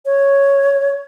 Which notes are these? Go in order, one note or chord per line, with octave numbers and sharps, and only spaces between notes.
C#5